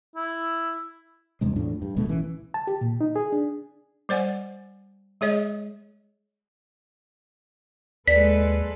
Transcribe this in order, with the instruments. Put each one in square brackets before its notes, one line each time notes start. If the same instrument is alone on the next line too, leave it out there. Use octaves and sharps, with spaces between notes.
[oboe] E4
[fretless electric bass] E2 G2 C3 G#3
E2 A2 F3 D4
G2
D1 B2 G#3 A3
A1 E3 C#4
[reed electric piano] A5
G4
A#2
D#4
G#4
D4
[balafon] G3 C5 D5 F#5 G#5
G#3 G#4 C#5 D#5
[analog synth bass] D#2 [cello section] G#3 A4 B4 [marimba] D5 [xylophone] B6